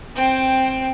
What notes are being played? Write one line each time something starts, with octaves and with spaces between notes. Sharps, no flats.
C4 G5